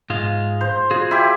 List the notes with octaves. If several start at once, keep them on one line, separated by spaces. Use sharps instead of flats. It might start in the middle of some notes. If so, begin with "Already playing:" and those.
G#2 G#3 F4
C5
F4 F#4 G#4
E4 G4